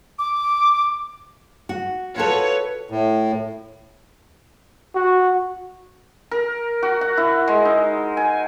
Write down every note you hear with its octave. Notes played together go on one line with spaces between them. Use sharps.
D6
F#4
F4 F#4 A4 B4 C#5
A2
F#4
A#4
F#4
F#5
E4
G#3
D#4
G#5